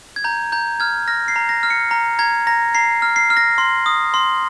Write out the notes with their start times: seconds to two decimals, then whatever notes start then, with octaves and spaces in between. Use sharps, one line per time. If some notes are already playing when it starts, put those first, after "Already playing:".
0.16 G#6
0.24 A#5 G6
0.52 A#5 G6
0.80 F6 G#6
1.08 F6 A#6
1.28 C7
1.36 A#5
1.49 A#6
1.63 F6
1.70 C#7
1.91 A#5
2.19 A#5 G#6
2.47 A#5 A#6
2.75 A#5 C7
3.02 F6
3.16 C7
3.30 F6
3.37 A#6
3.58 C6
3.86 D#6
4.14 C6